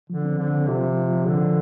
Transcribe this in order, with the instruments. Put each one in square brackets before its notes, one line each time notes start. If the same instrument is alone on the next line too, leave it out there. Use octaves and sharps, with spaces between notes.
[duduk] D3 [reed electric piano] F3
[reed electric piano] C4
[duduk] D3 [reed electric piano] C4
[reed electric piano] C4
[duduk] C3 [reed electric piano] F4
[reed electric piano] F3
F4
F3
[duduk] D3 [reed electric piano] F3
[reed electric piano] F3